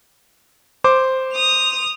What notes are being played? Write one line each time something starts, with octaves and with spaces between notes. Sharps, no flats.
C5 D6
D#6 F7